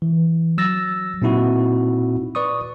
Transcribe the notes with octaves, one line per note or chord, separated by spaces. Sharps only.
E3
F#3 E6 A6 A#6
A#2 C4 D#4 E4 F#4
B4 D5 C#6 D#6